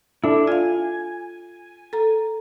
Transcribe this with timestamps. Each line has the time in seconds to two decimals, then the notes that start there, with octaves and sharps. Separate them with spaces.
0.24 D4 E4 A4
0.47 F4 F5 G#5
1.93 A4 A#5